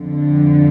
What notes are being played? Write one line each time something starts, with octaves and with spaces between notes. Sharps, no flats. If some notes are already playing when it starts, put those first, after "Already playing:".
Already playing: F2 D3